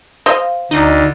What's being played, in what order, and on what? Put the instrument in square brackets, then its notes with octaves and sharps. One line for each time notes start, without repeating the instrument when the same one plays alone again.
[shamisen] C5 D#5 F5
[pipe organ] D2 [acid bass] D#4